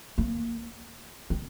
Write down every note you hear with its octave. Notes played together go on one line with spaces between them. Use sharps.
A#3
C4